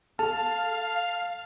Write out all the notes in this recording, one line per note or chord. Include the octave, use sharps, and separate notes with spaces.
A4 F5 A5 F6